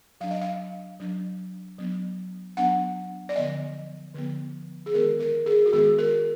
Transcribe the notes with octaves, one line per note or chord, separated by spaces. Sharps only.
F#3 D4 F5
D#5
F5
F#3 D4
F#3 B3 D4
F#3 B3 D4 F#5
D5
D3 F3 B3 D#5
D3 F3 B3
G#4
D#3 G#3 B3 A#4
A#4
G#4
F#4
D#3 G#3 B3 G#4
A#4